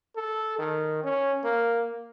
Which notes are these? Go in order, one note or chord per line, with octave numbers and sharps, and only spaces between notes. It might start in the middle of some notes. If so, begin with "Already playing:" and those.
A4
D#3
C#4
A#3